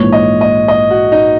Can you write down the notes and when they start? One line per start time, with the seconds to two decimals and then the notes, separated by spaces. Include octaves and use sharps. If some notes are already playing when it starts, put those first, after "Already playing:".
Already playing: A#1 G#2 E3 C#5
0.12 D#5
0.41 D#5
0.68 D#5
0.90 F#4
1.12 D#4